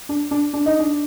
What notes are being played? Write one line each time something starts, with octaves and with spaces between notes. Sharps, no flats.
D4
D4
D4
D#4
D4